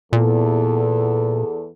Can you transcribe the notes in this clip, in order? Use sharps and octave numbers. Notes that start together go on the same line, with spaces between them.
E2 A#2 A4